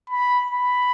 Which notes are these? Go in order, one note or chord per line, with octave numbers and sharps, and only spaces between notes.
B5
B5